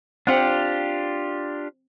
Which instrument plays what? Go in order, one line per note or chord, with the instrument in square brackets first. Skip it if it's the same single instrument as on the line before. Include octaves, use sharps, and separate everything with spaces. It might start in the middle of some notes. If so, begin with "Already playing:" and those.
[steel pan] C4 F#5 [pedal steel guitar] D4 F4 G4